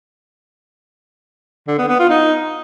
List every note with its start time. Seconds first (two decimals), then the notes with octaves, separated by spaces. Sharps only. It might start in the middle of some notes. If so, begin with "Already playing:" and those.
1.68 D3
1.78 B3
1.89 B3
1.99 F4
2.10 D#4